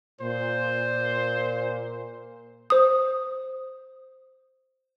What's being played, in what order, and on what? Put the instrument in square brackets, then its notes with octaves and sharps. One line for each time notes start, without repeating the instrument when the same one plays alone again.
[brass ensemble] A#2 [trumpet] C5
[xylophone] C5 D#6